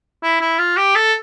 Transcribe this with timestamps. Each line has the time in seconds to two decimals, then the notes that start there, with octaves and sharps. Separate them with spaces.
0.23 E4
0.41 E4
0.59 F4
0.77 G4
0.95 A4